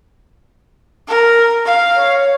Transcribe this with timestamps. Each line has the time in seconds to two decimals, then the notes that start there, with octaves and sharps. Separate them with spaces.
1.08 A#4
1.65 F5
1.96 C#5